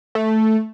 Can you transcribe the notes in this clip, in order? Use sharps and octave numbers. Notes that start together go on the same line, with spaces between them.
A3